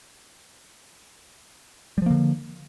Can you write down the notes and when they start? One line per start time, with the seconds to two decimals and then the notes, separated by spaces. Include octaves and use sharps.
1.98 G3
2.02 F3
2.06 A#3
2.11 D3